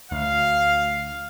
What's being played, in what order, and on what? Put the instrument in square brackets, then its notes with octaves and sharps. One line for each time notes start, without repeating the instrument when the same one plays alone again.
[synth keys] D2 [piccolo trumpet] F5